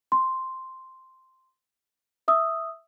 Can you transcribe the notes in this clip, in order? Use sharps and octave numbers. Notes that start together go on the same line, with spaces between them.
C6
E5 D#6 E6